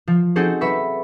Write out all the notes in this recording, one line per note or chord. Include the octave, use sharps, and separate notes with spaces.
F3
C4 D#4 F#4 G#4 A4 C5
F#3 B4 E5 B5 C#6 B6